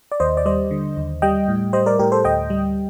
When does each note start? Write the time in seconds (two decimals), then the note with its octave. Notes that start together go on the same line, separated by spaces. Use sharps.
0.12 D5
0.20 D#2 C5 D#5
0.37 D5
0.46 G3 C5 D#5
0.71 D3
0.97 D#2
1.22 G3 D#5 G5
1.48 A2
1.73 G3 C5 D#5
1.86 A#4 D5
1.99 A2 G4 A#4
2.12 A4 C5
2.25 D2 D#5 G5
2.50 G3